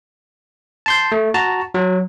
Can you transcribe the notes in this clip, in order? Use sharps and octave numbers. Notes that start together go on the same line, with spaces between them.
A5 C6 G6
A3
F#4 A5 A#5
F#3